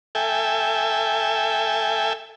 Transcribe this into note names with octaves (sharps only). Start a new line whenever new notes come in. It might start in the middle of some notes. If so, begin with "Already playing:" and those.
A4 E5 G5 G#5